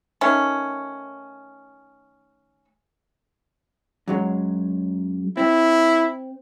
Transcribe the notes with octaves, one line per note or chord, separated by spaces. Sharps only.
D#3 A3 C#4
F#2 F#3 G#3
C4 E4